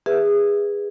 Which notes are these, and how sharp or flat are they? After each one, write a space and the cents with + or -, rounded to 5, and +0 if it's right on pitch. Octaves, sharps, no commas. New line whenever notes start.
G#4 -25 B4 +0 E5 +0